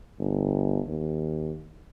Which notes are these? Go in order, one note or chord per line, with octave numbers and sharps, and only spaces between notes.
G1
D#2